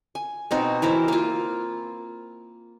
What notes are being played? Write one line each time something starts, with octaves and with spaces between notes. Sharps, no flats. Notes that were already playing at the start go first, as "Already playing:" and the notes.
G#5
B2 C4 D#4 F#4
E3 E4 A#4 C5
A#3 F4